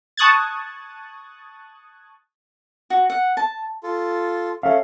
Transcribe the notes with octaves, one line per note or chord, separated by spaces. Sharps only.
A5 C#6 D#6 F#6 G#6 A6
F#4
F#5
A5
F4 A4
C#4 A4 E5 F5